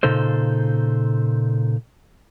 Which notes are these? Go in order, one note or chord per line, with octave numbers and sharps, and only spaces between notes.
A#2 C#3 D#4 A4 C5